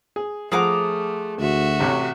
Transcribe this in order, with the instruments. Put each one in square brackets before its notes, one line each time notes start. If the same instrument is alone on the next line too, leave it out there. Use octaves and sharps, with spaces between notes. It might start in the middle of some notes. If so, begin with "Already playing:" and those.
[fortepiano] G#4
[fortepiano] F3 F#5 [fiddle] A3 [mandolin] G#4 A#5 D6
[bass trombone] D2 [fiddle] F#4 E5
[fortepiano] A1 C3 C#5